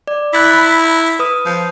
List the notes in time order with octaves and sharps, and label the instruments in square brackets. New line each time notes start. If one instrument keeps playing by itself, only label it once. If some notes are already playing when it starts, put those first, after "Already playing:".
[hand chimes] D5
[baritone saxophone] E4 [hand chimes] F#6 A6 B6
[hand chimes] B5
B4 D#6
[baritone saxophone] F3